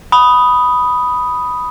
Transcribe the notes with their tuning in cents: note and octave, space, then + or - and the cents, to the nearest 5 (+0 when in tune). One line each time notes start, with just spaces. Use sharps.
B5 +0 D#6 +0